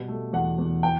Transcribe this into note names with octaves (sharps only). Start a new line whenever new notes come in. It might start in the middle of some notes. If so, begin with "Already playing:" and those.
Already playing: B2 G3
A3
E2 F#5
E2
E3 G5